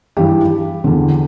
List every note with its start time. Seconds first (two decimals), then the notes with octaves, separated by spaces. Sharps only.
0.17 G2 E3 G4
0.84 E2 D3